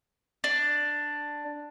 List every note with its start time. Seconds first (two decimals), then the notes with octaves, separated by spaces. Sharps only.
0.44 D4